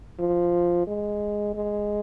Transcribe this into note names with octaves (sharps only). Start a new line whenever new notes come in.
F3
G#3
G#3